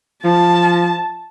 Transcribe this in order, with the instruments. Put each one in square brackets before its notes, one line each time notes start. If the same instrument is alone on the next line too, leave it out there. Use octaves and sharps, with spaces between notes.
[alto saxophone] F3 [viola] A5